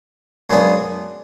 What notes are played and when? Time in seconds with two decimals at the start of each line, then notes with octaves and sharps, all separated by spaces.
0.50 F#2 C#3 G#3 B3 D4